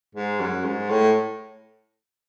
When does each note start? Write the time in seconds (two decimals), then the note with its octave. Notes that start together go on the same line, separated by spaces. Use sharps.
0.15 G#2
0.40 F#2
0.64 G#2
0.90 A2